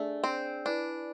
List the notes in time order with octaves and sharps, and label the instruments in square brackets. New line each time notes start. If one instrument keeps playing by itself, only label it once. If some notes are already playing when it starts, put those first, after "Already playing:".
Already playing: [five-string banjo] A3 [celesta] D4 G#4 D5 G#5
[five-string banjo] C4
[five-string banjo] D4 [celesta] E4 B4 D5 G#5 B5